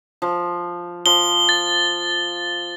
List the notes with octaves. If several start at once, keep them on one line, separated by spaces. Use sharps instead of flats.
F3
F3 G7
A6